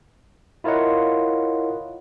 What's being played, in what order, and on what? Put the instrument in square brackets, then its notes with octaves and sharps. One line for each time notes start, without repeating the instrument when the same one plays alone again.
[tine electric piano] E4 F4 A#4 C#5 D#5 F#5